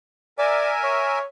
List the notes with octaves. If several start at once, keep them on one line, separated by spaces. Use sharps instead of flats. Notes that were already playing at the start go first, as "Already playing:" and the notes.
A#4 D5 E5 G#5
C#5